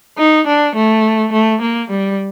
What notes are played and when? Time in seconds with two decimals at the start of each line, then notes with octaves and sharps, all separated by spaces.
0.18 D#4
0.47 D4
0.76 A3
1.33 A3
1.62 A#3
1.90 G3